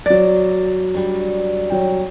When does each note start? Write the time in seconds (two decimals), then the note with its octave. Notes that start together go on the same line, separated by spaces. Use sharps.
0.06 F#3 D5 A6
0.95 G3 D4
1.70 F#3 G5